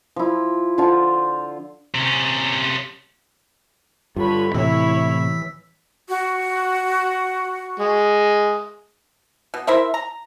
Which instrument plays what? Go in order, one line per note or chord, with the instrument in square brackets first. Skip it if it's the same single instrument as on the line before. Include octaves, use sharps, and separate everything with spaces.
[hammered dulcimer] F3 E4
D3 F4 C5 A5
[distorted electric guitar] C3 C#4
[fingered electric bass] G2 [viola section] D3 C#5 B5 [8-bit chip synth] F4
[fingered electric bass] A2 C3 [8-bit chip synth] E3 E6 B6 [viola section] E4 C#5
[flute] F#4
[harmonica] G#3
[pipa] B2
E4 A#4 C5 E5
A#5